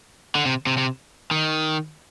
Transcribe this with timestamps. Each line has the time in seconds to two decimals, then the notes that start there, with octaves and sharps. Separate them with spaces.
0.35 D3
0.45 C3
0.67 C3
0.77 C3
1.31 D#3